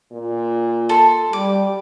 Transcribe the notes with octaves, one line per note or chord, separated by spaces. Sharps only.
A#2
A4 C6
G3 G4 D6